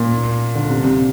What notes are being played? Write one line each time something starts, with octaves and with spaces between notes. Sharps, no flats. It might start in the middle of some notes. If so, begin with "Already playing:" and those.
Already playing: A#2
D3
C3
C3